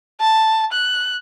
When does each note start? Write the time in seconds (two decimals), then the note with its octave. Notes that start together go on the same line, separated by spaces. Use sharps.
0.20 A5
0.72 F#6